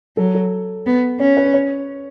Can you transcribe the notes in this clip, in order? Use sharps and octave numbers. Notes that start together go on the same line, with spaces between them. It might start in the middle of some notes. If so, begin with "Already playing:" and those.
F#3 A4
A4
B3
C#4 C#5
B4
C#5